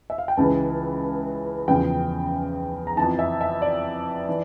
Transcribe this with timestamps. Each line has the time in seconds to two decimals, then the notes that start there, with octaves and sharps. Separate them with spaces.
0.10 E5
0.18 F5
0.28 G5
0.37 C#2 C#3 E3 A5
1.68 E2 C#3 F3 G5
2.87 A#5
2.97 F2 E3 A5
3.19 E5
3.41 E5
3.62 D5
4.29 E3